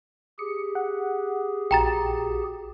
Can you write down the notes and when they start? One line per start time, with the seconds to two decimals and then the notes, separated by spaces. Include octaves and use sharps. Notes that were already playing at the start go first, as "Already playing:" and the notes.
0.39 G4 G#4 C#7
0.75 F#5
1.71 A#1 F#4 G5 A#5 A6